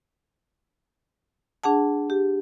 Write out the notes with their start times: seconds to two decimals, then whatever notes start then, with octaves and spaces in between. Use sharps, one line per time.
1.64 D4 G#4 F#5 A5
2.10 G4